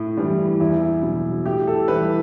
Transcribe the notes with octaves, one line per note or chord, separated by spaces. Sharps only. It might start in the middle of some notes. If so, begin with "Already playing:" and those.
Already playing: A2
E3 G3
E2 E4
B2 F#3
A2 G4
A4
E3 G3 B4